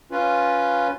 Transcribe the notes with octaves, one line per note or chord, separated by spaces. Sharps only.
C#4 F4 B4